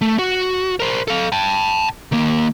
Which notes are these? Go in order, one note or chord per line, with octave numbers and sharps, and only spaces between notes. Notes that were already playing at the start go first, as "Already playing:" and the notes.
A3
F#4
A#4 C5
A4 F5
G5 A5
D#3 A#3